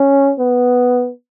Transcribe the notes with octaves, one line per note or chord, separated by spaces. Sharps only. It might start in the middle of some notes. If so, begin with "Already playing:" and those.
Already playing: C#4
B3